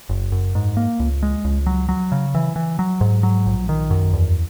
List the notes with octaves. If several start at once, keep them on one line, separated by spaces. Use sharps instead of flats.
F#1
F#2
G#2
A#3
C#2
G#3
C#2
F#3
F#3
C#3
E3
E3
F#3
G#2
F#3
A#1
D#3
F#2
E2